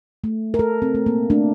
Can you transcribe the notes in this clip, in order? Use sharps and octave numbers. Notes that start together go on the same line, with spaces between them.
A3
A#4
A3 A4
C4
A3
A#3
A3 D4